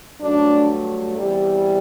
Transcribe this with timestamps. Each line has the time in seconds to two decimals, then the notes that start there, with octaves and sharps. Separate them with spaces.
0.21 G2 F#3 A3 D4
1.18 E2 C3 E3 G3